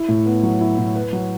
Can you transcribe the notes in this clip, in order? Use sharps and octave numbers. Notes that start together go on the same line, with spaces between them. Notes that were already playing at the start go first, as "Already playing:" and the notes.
Already playing: E4
A2
B3
F#3
E4
A2
B4
F#3